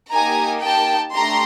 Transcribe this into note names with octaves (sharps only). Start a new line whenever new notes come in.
A#3 D#4 G4 G#5 A#5
G5 A5
A3 D4 G4 A#5 C6